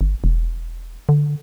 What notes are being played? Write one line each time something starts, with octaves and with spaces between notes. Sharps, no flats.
G1
E1
D3